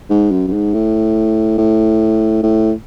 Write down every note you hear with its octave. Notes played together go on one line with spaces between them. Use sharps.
G#2
F#2
F#2
G#2
A2
A2
A2